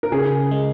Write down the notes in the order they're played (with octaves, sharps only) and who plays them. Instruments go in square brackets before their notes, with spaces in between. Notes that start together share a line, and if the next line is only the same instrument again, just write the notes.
[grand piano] A#4
[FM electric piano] C#3 [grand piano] G#4
[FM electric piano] G#3